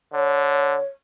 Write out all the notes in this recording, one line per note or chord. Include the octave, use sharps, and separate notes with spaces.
D3 C#5